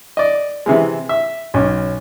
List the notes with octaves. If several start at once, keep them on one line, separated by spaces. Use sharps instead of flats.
D5 D#5
C3 E3 G#3
E5
B1 C#4